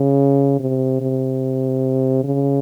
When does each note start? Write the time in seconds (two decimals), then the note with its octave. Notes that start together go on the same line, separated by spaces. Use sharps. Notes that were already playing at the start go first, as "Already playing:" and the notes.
Already playing: C#3
0.60 C3
1.01 C3
2.24 C#3